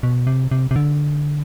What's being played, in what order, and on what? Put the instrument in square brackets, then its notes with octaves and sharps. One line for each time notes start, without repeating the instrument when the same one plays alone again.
[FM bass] B2
C3
C3
C3
D3